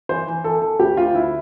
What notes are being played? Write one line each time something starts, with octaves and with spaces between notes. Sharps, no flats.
E3 C5
E3
E3 A4
E3 A4
D2 G4
D2 F4
D2 E4